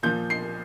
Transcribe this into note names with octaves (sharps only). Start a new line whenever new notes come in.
A#2 F3 G6
C7